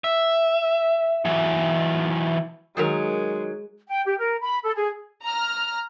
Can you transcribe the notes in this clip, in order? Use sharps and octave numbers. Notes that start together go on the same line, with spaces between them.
E5
E3 F#3
D#3 F#3 G#3 A#4
G5
G4
A#4
B5
A4
G#4
A#5 F6